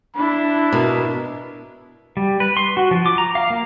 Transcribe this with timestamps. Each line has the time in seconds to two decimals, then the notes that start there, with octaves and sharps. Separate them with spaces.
0.15 D4 E4 B5
0.73 B2 A#4
2.17 G3
2.40 B4
2.57 C6
2.77 F#4
2.91 F3
3.06 D6
3.18 A#5
3.35 F5
3.50 A#3